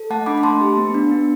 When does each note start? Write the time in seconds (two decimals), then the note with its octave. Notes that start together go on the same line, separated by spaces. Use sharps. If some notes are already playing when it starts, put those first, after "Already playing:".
Already playing: A4
0.10 A3 F#5 A5
0.26 D4 B5 D6
0.38 B5
0.43 A3 A5 C6
0.61 G4
0.77 B3
0.94 D4
1.11 B3